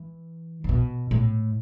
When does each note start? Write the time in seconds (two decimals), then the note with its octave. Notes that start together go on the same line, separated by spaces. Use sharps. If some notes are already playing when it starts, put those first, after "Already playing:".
Already playing: E3
0.64 D3
0.69 B2
1.11 A2